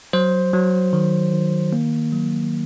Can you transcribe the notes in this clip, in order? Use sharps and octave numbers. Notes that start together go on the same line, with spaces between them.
F#3 C5
F#3
D#3
D#3
A#3
F#3